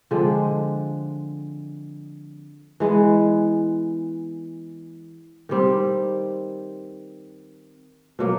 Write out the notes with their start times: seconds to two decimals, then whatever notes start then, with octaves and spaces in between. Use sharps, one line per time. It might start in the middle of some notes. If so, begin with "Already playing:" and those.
0.11 D3 F3 G#3 C4
2.80 E3 G#3 B3
5.49 D#3 G3 C4
8.19 B2 F#3 A#3